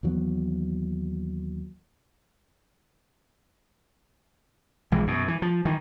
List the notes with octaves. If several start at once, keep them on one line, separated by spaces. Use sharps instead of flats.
D#2 E3 F#3 B3
A#1 E3 G#3
F#2 B2
E3
F3
D#3 E3